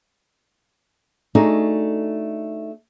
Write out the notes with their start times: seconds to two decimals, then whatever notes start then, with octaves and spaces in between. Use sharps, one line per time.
1.35 A3 D4 D#4 F#4 G#4